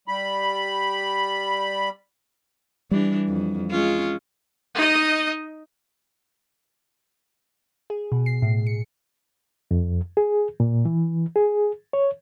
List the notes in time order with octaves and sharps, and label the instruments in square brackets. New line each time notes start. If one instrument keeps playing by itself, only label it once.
[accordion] G3 B5
[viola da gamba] E3 D4 [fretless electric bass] G3
[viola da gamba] F2
G#3 C#4 F4
[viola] D#4 D#5
[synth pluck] G#4
B2
C7
A2
C#7
[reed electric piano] F2
G#4
A#2
E3
G#4
C#5